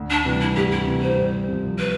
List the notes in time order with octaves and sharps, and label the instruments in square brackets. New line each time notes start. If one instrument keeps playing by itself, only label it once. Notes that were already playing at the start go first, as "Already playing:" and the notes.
Already playing: [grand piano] D2
[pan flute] D4
[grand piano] C3 E3 G3
[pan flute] E4
[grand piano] D2 [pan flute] G4
[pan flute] E4
[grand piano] C3 E3 G3
[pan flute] C5
[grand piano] C2
C3 F3
[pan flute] B4